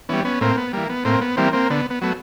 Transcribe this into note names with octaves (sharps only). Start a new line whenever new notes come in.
E3 G3 B3 C#4
B3 C#4
A2 A#3 C4
B3
E3 G3 A#3
B3
A2 A#3 C4
B3
E3 G3 A#3 C4
A#3 C4
D3 B3
B3
F#3 A3 B3